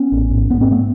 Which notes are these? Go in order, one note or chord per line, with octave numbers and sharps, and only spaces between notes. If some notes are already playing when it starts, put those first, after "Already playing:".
Already playing: B3 C#4
A1
G#2
G#2 B3
C4
A3 B3